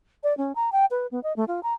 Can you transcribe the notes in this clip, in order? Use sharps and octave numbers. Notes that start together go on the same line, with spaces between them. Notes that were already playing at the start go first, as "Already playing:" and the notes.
D5
C#4
A#5
G5
B4
B3
D#5
A3
F4
A#5